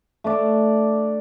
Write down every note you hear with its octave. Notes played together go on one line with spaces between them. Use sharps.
A3 D4 D5